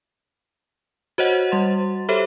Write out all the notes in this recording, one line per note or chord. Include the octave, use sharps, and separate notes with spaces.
F#4 C5 C#5 D#5 F#5
G3 C6 A6
G4 A4 C5 C#5 E5 B5